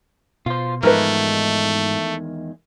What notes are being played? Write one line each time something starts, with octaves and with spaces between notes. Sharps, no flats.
B2 F4 C5
E2 G#2 D#3 F3 G#3 A3 A#4 B4